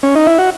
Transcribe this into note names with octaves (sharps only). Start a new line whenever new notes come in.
C#4
D#4
E4
F#4